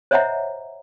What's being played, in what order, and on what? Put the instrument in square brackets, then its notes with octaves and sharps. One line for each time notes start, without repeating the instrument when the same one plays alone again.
[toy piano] C5 C#5 D#5 E5 F#5 A#5